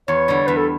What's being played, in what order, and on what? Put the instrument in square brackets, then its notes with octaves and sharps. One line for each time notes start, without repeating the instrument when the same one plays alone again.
[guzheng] E2 [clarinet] C#5
[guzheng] D3 G3
[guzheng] E2 [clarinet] B4
[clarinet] A4